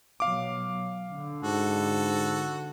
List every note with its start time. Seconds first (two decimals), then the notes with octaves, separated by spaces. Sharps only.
0.20 B2 F#3 F5 D6
1.11 D3
1.43 G#2 F#4 A4